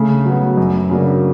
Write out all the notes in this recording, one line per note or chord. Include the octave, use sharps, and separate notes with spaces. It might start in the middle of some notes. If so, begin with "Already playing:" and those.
Already playing: C#3 A3
F#3 B3
F#2
C#3 F#3 A#3 D4